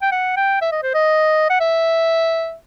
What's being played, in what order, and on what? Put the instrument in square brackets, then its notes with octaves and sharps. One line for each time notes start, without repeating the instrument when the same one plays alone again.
[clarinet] G5
F#5
G5
E5
D#5
C5
D#5
F#5
E5